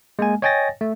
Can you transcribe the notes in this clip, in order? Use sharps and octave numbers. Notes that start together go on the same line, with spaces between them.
G#3 A#3 G#5
C#5 D#5 G5 G#5 A6 A#6
A3